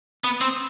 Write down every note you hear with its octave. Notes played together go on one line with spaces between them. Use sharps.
B3
C4